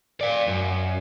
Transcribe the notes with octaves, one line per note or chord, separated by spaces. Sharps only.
D5 F5
F#2